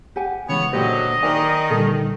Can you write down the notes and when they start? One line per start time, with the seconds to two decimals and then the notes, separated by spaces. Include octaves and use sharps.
0.16 G4 F#5 G#5
0.49 C#3 E3 G#3 B3 C#5
0.73 A#2 D3 F#3 A#3 G4 C5 D#5
1.23 D#3 A#4 D5 E5 G#5
1.70 A#2 D3 G3 A4